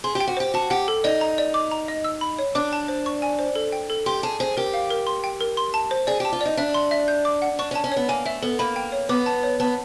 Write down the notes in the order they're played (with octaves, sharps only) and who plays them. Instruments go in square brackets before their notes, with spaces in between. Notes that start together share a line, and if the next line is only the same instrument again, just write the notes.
[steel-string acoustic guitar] G#4 [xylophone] C6
[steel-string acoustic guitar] G4
[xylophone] G5
[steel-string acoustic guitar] F#4
[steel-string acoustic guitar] G4 [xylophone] C5
[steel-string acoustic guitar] F#4 [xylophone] A5
[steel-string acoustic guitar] G4 [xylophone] F#5
[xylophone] A4
[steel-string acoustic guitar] D#4 [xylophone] D5
[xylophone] A#5
D5
D6
A#5
D#5
E6
B5
C#5
[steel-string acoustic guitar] D4 [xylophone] D6
[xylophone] A5
C5
C#6
G#5
C5
A4
G5
A4
[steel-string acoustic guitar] G4 [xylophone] C6
[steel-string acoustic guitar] G#4 [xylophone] A5
[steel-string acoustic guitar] G#4 [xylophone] C5
[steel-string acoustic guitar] G4 [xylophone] A#4
[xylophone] F5
A#4
C6
G5
A#4
C6
A5
C5
[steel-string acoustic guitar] G#4 [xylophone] D5
[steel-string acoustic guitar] G4 [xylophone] A5
[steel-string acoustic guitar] F4
[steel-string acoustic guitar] D#4 [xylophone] D5
[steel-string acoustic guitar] D4 [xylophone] E5
[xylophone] C6
E5
G6
D6
F#5
[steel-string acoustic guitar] D4 [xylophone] C#6
[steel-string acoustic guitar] C#4
[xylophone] A5
[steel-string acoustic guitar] C#4
[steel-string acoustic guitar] B3 [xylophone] C#5
[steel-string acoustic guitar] A#3 [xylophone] G#5
[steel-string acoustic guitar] A3 [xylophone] E5
[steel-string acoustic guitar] B3 [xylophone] A4
[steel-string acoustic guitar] A#3 [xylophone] B5
[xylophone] G5
C#5
[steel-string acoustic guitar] B3 [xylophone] D6
[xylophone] A5
C#5
[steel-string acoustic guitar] B3 [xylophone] A5